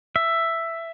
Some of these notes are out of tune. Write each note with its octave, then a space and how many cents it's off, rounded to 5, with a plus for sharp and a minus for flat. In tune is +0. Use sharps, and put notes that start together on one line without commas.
E5 +10